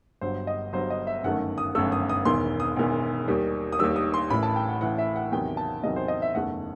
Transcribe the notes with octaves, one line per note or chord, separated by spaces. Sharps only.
G1 G2 F#3 C5
D#5
G1 G2 F#3 C5
D#5
E5
G1 F#2 D#3 A3 F#5
D#6
G1 F#2 D#3 A3 E6
D#6
D#6
E1 E2 D#3 C6
D#6
E1 E2 D#3
D#2 D#3 G3
D#6
D#2 D#3 G3 E6
D#6
C6
A1 A2 E3 B5
A5
G5
F#5
A1 A2 E3 F#5
E5
F#5
E2 C3 D#3 F#3 G5
A5
E2 C3 D#3 F#3 D#5
C5
D#5
E5
F#1 E2 D#3 A3 F#5